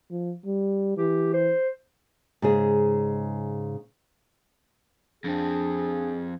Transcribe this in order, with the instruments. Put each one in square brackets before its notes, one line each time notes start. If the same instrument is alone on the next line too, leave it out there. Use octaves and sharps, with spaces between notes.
[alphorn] F3
G3
[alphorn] E3 [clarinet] G4
[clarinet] C5
[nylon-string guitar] G#2 C#3 G#4
[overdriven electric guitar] F2 C4 [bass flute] D4 [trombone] G#4